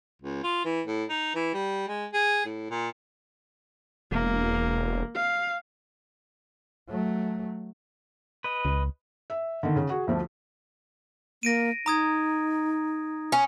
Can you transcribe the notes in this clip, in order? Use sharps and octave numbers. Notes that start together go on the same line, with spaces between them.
C#2
F4
E3
A2
D#4
E3
G3
G#3
G#4
A2
A#2
E1 A#3
F5
F#3 A3
B4 D#5
C#2
E5
D3 D#3
C#3
F#4 G#4
D2 F3 A3
A#3 A#6 D7 D#7
D#4 A#5 D#6 G#6
C#4